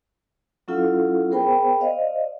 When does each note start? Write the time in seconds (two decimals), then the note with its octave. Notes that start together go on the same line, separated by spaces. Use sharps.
0.68 F#3 C#4 E4 F4 A4 F5
1.30 B3 G#4 A#4 C5 G5 B5
1.81 C5 D5 D#5 F5